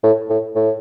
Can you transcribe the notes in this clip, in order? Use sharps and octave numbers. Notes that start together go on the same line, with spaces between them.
A2
A2
A2